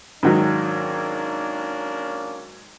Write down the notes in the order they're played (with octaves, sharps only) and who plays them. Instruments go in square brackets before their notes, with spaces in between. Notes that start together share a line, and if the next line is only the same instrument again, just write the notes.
[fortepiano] G#2 D#3 F#3 [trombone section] A#3 C#4 D4